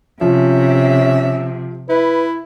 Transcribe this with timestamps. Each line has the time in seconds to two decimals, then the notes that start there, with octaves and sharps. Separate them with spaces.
0.21 C3 F3 C#4 E5
1.89 E4 B4